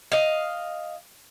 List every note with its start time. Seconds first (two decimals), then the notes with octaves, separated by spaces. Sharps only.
0.12 D#5 F5